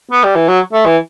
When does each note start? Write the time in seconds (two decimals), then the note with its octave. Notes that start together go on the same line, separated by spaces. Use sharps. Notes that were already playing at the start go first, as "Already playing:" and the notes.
0.11 B3
0.24 G3
0.35 E3
0.48 F#3
0.73 A3
0.86 E3